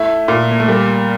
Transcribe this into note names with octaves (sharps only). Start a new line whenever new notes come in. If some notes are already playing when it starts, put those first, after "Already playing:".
Already playing: A3 E4
A#2
A#3
A3
G3 A#3